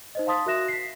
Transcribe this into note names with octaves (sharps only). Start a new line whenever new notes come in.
D#4 C5 D#5
F5 A5 C6 D#6 A6 B6
F#4 A#4 E5 F#6 A#6 E7
B6 C7